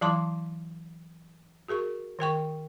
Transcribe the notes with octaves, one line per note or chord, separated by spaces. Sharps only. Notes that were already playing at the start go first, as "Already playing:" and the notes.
E3 F#3 E4 A5 C6 D6
F#4 G#4 A#4 C#6
D#3 A#4 G5 C#6